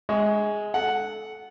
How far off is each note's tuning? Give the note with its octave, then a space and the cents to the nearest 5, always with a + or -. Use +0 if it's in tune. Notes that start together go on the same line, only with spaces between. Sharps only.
G#3 +0 D#5 +35 C#6 +25
A4 -20 F#5 +0